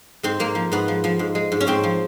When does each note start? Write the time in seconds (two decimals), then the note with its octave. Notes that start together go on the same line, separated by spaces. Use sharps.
0.23 G#2 C4
0.39 G#2 A#3
0.55 F3
0.72 G#2 B3
0.88 F3
1.04 F3
1.19 G#2
1.35 G#3
1.52 G#2
1.61 C#4
1.67 G#2 C4
1.84 F3